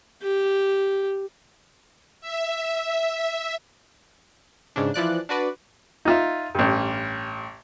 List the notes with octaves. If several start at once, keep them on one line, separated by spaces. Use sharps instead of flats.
G4
E5
G#2 C#3 D4
E3 F3 D5 F#6
D4 F#4 B4 D5
D#4 F4 E5
A1 G2